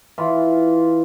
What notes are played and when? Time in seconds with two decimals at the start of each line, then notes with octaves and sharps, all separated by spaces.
0.18 E3 F4